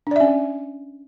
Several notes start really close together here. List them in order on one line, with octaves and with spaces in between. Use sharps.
D4 D5 E5 C#4